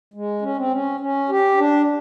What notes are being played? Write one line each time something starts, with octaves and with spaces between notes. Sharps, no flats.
G#3
C#4
C4
C#4
C#4
G4
D4